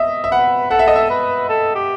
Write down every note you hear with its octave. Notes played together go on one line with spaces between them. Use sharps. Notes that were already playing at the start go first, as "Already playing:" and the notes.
Already playing: D#5 E5
E5
B4 F#5
A4 F#5
E5
D#5
E5
B4
A4
G4